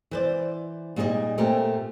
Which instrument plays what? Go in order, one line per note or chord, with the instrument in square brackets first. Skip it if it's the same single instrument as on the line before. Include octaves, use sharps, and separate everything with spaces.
[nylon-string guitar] E3 C5 D5
A#2 G3 D#4 G#4 C#5 D#5
A#2 A3 C4 G4 A#4